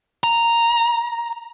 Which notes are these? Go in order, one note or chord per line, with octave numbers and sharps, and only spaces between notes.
A#5